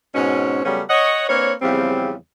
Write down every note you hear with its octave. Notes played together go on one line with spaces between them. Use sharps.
G#2 B2 C4 C#4
C#3 F#3 G3 A3 B3 C#4
C#5 D#5 F#5
A#3 C4 D4 B4 C#5
E2 C#3 F3 G3 C4